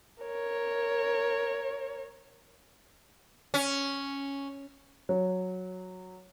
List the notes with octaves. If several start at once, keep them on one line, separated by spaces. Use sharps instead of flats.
A#4 C#5
C#4
F#3